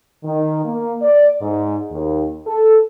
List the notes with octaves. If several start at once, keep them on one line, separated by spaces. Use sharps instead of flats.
D#3
A#3
D5
G#2
D#2
A4